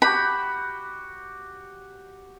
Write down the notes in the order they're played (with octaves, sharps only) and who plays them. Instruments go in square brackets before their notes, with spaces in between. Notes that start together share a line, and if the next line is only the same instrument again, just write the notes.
[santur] F#4 G4 [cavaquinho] B5